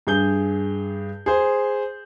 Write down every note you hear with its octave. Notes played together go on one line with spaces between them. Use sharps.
G2 G#4 G6 G7
G#4 C5